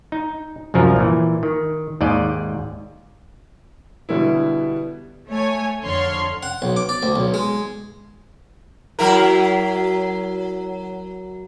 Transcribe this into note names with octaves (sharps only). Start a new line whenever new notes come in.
D#4
C2 F#2 F3 A#4
A#2 E3
D#3
D#2 G#2 D5 D#5
B2 D3 G3 B3 E4
A3 C#5 G#5
F2 D3 C#5 C6 F6
F#5
B1
D6
D5
D2
B1
G#3
F#3 E4 A#4